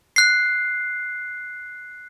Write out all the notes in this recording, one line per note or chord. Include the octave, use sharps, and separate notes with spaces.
F#6 C7